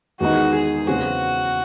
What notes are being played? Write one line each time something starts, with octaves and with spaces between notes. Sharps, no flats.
E2 D#3 G#3 D#4 F#4
G#4
E2 C#3 F#3 C4 F#4